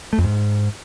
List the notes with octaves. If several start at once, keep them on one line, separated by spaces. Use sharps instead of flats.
A3
F2
G#2